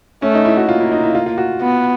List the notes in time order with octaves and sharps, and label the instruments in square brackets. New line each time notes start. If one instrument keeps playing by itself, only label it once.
[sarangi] A3 [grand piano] C#4
[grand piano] D#4
E4
F#4
[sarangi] A#3 [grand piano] F4
[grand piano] E4
D#4
E4
F4
F4
F#4
[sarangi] B3